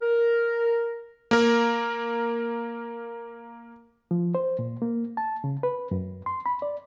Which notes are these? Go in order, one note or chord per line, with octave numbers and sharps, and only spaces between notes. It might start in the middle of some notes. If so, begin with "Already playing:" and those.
A#4
A#3 A#4
F3
C5
A#2
A#3
A5
C#3
B4
F#2
C6
B5
D5